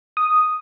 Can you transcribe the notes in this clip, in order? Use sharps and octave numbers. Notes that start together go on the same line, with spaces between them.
D#6